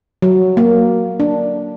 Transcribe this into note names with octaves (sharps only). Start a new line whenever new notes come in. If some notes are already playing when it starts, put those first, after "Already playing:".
F#3
A#3
D4